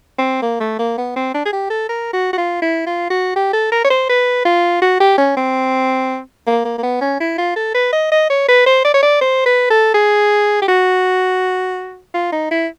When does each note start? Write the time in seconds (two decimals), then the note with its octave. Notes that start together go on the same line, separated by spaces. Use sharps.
0.18 C4
0.42 A#3
0.60 A3
0.79 A#3
0.98 B3
1.16 C4
1.34 D4
1.45 G#4
1.53 G4
1.70 A4
1.89 A#4
2.13 F#4
2.33 F#4
2.38 F4
2.62 E4
2.86 F4
3.10 F#4
3.36 G4
3.53 A4
3.72 A#4
3.84 C#5
3.90 C5
4.09 B4
4.45 F4
4.82 F#4
5.00 G4
5.18 C#4
5.37 C4
6.47 A#3
6.65 A#3
6.78 A#3
6.83 B3
7.01 C#4
7.20 E4
7.38 F4
7.56 A4
7.74 B4
7.92 D#5
8.12 D#5
8.30 C#5
8.48 B4
8.66 C5
8.85 D5
8.94 C#5
9.02 D5
9.21 C5
9.46 B4
9.70 A4
9.94 G#4
10.62 G4
10.68 F#4
12.14 F4
12.32 D#4
12.51 E4